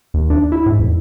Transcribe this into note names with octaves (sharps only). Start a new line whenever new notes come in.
D#2
D4
E4
G#2
E2